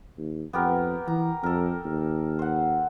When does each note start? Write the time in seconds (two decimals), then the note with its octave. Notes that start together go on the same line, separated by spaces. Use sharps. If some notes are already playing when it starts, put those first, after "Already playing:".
0.18 D#2
0.53 F2 B3 G4 A#4
1.08 E3 A#5
1.43 F2 A4 A#4
1.85 D#2
2.39 C5 F#5